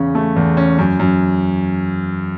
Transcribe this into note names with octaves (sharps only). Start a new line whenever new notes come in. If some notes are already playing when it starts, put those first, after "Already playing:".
Already playing: E2 C#3 C#4
A3
E2
C#4
F#2
F#2